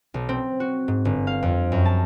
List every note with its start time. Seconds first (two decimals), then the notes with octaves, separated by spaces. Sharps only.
0.14 B1
0.29 C4
0.60 F#4
0.88 G#2
1.05 G1
1.27 F5
1.42 F2
1.72 F#2
1.85 A5